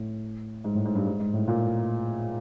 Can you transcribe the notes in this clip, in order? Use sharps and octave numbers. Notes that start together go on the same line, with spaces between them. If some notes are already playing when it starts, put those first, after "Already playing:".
Already playing: A2
G#2
A2
G#2
G2
G#2
G#2
A2
A#2